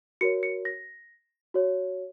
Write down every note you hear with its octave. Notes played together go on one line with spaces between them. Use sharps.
F#4 A#4 C#5 C#7
C#7
A#6
F#4 C#5